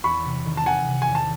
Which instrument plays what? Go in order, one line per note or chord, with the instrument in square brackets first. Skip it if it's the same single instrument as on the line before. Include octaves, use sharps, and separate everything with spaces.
[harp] E2 [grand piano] B5 C#6
[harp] C3
D#3
[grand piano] A5
[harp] D#3 [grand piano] F#5 G#5
[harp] C3
[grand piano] G#5
[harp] E2
[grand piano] A5